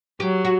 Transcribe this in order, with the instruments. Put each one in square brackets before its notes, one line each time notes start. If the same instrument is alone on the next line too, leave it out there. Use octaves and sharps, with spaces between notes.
[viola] F#3 [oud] G4
[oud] F#4